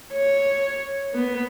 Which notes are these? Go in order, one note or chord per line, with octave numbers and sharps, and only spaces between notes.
C#5
B3